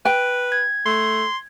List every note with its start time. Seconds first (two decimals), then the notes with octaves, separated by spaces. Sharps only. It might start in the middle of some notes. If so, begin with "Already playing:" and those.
0.05 B4 G5
0.52 G#6
0.86 A3 C6